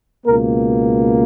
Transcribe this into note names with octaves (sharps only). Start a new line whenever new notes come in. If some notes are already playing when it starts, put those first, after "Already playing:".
C#2 B2 A#3 A#4